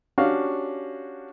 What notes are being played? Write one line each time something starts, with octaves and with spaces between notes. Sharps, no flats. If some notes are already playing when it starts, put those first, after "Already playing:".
C#4 D4 F#4 G4 F5